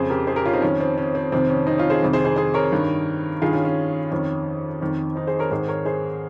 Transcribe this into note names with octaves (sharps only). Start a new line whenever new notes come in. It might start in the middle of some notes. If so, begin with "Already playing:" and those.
Already playing: F2 C#3 G#4 C5
G4 A#4
G#4 C5
G4 A#4
C#4 F4
C4 D#4
F2 D#3 C#4
C4
C#4
C4
F2 C3 D#3 C4
C#4
C4 D#4
C#4 F4
G#4 C5
F2 C3 D#3
G#4 C5
G#4 C5
G#4 C5
A#4 C#5
G2 D#3
G2 D#3 F4 G#4
C#4 F4
C#4
F2 D#3 C#4
F2 D#3
C4 D#4
G#4 C5
A#4 C#5
G#2 D#3 G#4 C5
A#4 C#5
G#4 C5